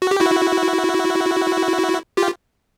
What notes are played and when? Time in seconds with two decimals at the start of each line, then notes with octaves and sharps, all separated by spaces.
0.02 F#4
0.11 G4
0.20 E4 F#4
2.17 F4 G4